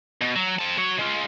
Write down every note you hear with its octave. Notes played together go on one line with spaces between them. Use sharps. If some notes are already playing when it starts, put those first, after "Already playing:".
B2
F#3
C4 A5
F#4 C#5
G#3 F4